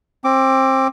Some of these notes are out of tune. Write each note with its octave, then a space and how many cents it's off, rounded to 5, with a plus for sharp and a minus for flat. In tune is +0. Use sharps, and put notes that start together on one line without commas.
C4 +25 D6 +0